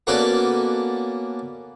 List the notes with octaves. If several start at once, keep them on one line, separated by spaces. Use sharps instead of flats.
A#3 B3 C#4 F#4 A4 D5